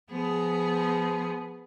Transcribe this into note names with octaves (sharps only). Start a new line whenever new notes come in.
F3 B3 G#4